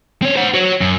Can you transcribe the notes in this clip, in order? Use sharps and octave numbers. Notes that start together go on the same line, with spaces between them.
C4 C#5
C5 F#5
F#4 C#5
F#2